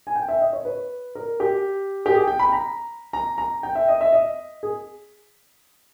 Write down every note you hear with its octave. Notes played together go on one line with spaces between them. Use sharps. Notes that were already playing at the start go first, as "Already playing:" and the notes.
G#5
G5
E5
D#5
C#5
B4
A#4
G4
G4
G#4
G5
B5
A#5
A#5
A#5
G5
E5
D#5
E5
D#5
G#4